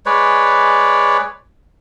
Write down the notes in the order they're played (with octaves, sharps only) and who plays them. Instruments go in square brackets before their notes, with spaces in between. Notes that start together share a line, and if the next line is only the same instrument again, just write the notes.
[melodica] G#3 B4 C#5 D5